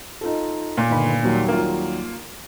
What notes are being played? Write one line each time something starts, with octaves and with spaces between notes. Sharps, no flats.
D#4 F4 A4
A#2
G1 D#3 B5
D#2 F#3 G3
A#3 F4